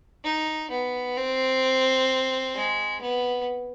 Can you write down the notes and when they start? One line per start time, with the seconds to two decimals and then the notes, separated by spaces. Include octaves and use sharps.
0.25 D#4
0.71 B3
1.17 C4
2.55 G#3
3.01 B3